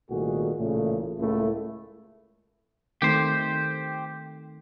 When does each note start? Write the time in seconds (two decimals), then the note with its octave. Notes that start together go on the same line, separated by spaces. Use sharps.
0.10 C2 A#2 D#3 A3 F#4 G#4
0.57 A1 A#2 C#3 E3 A3
1.19 C#2 A2 A3 A#3 E4 A4
3.02 D#3 A3 C4 G4 C5